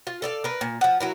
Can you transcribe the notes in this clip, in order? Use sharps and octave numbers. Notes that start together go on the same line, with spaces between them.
F4
A4 D5 F5
A#4 B4
A#2
F3 F#5
F#3 E4 A#4